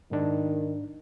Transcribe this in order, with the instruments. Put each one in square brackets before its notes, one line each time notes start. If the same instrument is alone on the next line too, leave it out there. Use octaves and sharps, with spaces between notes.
[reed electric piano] G#2 D4 [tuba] D#3